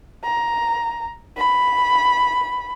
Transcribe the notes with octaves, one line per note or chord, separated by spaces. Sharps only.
A#5
B5